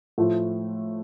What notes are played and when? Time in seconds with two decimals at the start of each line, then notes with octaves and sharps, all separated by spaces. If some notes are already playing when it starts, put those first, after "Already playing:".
0.18 A2 F3 A3